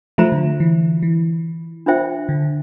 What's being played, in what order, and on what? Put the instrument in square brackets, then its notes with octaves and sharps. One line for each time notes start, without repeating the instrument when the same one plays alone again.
[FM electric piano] F3 A3 [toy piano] F4 C5 E5 A#5
[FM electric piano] D3
E3
E3
[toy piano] D4 F4 C5 E5 G5
[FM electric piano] D3